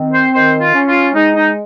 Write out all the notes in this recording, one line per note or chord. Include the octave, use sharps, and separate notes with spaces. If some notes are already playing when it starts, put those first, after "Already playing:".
Already playing: D#3 C4
C5
D#3 C5
F4
C#4
F4
G#3 D#4
D#4